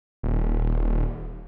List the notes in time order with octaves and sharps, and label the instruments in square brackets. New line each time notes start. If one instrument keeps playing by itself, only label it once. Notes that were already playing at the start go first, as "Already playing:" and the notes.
[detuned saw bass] D#1